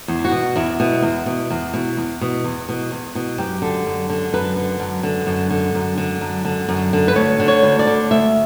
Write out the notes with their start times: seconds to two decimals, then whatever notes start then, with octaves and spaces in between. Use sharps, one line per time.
0.08 E2
0.25 F#4
0.32 B2
0.56 E2 E4
0.80 B2
1.02 E2
1.26 B2
1.50 E2
1.74 B2
1.97 E2
2.21 B2
2.44 E2
2.69 B2
2.91 E2
3.15 B2
3.38 F#2 G4
3.62 D3
3.86 F#2
4.10 D3
4.33 F#2 B4
4.56 D3
4.80 F#2
5.03 D3
5.27 F#2
5.50 D3
5.75 F#2
5.98 D3
6.21 F#2
6.45 D3
6.69 F#2
6.93 D3
7.08 B4
7.15 D2 C#5
7.40 D3
7.48 C#5
7.63 D2
7.79 D5
7.87 D3
8.11 D2 E5